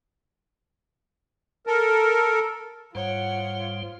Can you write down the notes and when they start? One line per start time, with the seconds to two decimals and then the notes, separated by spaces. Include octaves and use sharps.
1.67 A4 A#4
2.95 G#2 G3 F4 C5 C#5 F#5